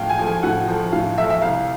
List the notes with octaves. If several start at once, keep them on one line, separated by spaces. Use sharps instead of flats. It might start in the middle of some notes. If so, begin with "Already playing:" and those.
Already playing: A2 F3 A3 F5 G5
G#5
F3 A3
G#5
A2 F#5
F3 A3
A2 F5
F3 A3 E5
E5
C2 F5